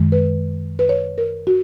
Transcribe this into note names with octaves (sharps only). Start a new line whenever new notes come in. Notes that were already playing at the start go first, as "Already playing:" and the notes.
Already playing: F#2 D#3 G#3
B4
B4
C#5
A#4
F#4